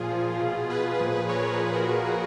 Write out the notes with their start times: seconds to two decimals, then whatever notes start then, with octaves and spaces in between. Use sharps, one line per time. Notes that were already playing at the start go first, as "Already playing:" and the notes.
Already playing: A#2 F3 F4 G#4
0.11 A#2 F3
0.40 B2
0.70 B2 G#4 B4
1.00 A#2 F3
1.29 A#2 F3 A#4 C#5
1.58 A#2 F3 G#4 B4
1.73 F#4 A#4
1.89 A#2 F3